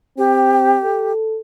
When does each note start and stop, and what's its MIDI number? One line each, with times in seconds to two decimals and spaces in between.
0.18 0.79 60
0.18 1.12 67
0.84 1.39 69